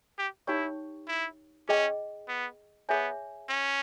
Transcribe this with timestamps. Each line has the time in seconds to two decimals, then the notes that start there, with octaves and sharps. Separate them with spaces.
0.18 G4
0.47 D#4 E4 G4 C#5 G5 C#6
1.08 E4
1.68 C#4 G#4 D#5 G5
2.28 B3
2.89 B3 G#4 C#5 E5 G#5
3.49 C#4